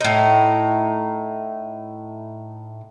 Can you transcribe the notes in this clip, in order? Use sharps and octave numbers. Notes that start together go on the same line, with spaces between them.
A2 D#4